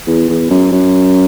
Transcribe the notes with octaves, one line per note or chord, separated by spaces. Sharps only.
E2
E2
F#2
F#2